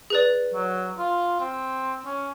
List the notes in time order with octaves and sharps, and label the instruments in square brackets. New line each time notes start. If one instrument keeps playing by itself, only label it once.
[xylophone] G#4 B4 D5
[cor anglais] F#3
F4
C4
C#4